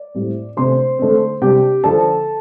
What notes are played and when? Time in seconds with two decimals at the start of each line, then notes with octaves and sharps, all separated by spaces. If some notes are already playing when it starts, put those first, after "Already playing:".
Already playing: D5
0.15 A2 G3 C4
0.57 C3 A3 D4 C5 C6
0.99 D3 A3 C4
1.42 C3 G3 D4 G4 G5
1.84 D3 F3 D4 A4 A5